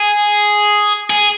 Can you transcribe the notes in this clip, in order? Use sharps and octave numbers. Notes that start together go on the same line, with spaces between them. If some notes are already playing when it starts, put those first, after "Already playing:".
Already playing: G#4
G#4